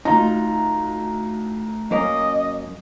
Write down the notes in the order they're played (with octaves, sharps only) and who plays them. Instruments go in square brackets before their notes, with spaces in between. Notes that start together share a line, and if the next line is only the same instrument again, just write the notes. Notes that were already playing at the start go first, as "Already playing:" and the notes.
[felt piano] D2 A#5 [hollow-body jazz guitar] D#4 F4
[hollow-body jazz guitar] F#2 A#3 C#4 [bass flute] D#5